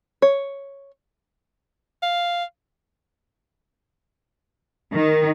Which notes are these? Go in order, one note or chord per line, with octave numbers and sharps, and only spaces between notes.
C#5
F5
D#3